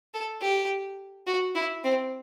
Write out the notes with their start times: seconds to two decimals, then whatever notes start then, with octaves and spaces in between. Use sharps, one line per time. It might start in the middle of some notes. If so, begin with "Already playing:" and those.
0.14 A4
0.42 G4
1.27 F#4
1.55 E4
1.84 C4